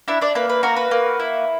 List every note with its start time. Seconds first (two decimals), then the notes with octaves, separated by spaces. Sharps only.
0.08 D4 E4 E5
0.21 D4 D5
0.35 A#3 B4
0.49 B4
0.63 F#4 A#4
0.77 B4
0.91 A#3
1.20 E4